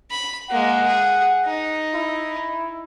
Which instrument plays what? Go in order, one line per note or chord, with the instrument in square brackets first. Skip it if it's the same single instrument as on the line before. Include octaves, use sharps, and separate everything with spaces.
[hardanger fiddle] B5
[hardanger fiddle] G#3 A#3 [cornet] F#5
[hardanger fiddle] G#4
D#4
[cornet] E4